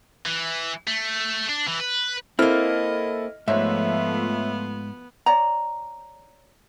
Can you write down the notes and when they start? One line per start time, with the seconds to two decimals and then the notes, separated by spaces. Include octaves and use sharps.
0.26 E3
0.87 A3
1.49 D4
1.67 E3
1.80 B4
2.39 A#3 C4 E4 A4 D#5 F6
3.48 G#2 F3 A3 B3 F4 C#5 E5
5.26 C#5 D5 A#5